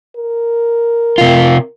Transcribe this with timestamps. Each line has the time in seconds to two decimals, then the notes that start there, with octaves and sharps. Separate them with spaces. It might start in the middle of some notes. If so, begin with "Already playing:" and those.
0.17 A#4
1.18 C3 F4